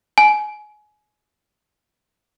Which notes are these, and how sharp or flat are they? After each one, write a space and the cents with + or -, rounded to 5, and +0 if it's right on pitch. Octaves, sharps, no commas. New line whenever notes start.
G#5 +25